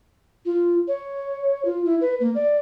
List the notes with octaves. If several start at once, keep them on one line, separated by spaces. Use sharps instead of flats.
F4
C#5
F4
E4
B4
A#3
D5